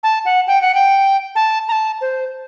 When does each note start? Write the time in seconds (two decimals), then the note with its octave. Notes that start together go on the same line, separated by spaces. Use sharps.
0.03 A5
0.25 F#5
0.48 G5
0.61 F#5
0.74 G5
1.36 A5
1.68 A#5
1.72 A5
2.01 C5